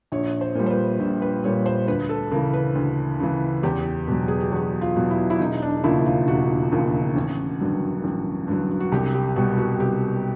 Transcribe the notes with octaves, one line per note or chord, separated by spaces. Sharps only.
A#1 C#5
C5
A#2 G3
C5
B4
A#1
B4
A#2 G3 C#5
C5
D2 B4
A4
C#3 E3 A#4
B4
D2
C#3 E3
E2 G4
B2 F#3
G#4
G4
E2 F#4
F4
B2 F#3
E4
E4
E1 D#4
D4
D#2 C#3 F3 E4
F4
E1 F#4
D#2 C#3 F3
A1
G2 D3 F#3
A1
G2 D3 F#3
F#4
C2 G4
G4
B2 G3 F#4
F#4
C2 G4